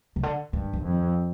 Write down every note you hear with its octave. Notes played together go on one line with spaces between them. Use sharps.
C3
D3
G2 D#3
D#3
F2